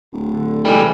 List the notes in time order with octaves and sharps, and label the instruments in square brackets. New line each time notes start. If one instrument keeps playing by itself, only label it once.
[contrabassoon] D1
[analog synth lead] D3
[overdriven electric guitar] C2 G3 [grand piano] E3 G#3 [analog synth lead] A4